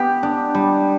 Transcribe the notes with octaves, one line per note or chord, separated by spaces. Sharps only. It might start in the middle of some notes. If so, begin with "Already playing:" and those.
Already playing: B3 G4
D4
G3